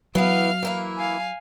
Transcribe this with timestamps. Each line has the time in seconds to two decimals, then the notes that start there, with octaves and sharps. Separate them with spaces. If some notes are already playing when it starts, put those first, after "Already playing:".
0.15 E3 F#3 B3 F5 F6
0.63 E3 A#3 E4
0.97 F5 G#5